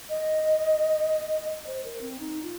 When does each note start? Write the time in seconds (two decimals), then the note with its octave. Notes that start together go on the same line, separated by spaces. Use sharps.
0.10 D#5
1.49 D#5
1.67 C5
1.84 A#4
2.01 C4
2.20 D#4
2.43 F4